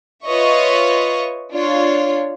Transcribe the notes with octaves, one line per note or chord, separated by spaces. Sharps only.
F4 B4 C#5 D#5 E5 C#6
D4 F4 C#5